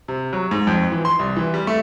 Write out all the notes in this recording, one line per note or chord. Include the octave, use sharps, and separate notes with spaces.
C3
F#3
G#2
F2
E3
C6
C2
E3
G3
A3